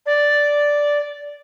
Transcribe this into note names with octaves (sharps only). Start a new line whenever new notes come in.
D5